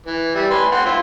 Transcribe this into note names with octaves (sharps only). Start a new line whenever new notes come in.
E3
G3 E5
B4 G#5 C6
F#5 G5 C6
E4 F4 C5